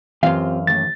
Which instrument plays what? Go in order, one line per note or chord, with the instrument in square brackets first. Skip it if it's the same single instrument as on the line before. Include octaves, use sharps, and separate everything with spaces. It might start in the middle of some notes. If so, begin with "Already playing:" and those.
[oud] F#2 F5 [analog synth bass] E3 [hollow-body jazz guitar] C4 F4 G4
[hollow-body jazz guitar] D#2 A2 [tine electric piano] A6